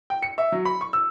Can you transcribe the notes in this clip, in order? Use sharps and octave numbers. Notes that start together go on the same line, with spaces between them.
G5
C#7
E5
F#3
B5
C#6
E6